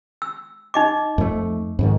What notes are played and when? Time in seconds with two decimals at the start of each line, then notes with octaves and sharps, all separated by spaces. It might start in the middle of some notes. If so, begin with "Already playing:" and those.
0.22 E6
0.74 D#4 D#5 D6
1.18 F2 A3
1.79 F2 G#2 D#3